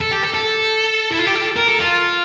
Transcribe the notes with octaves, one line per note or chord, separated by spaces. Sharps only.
A4
G4
A4
A4
E4
F4
G4
A4
A#4
A4
F4